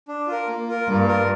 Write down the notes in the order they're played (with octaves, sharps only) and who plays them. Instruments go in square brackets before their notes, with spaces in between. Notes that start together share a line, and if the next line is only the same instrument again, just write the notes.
[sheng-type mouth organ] D4
F4 A#4
A#3
F4 A#4
[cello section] G2 [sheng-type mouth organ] A#3
[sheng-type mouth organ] F4 A#4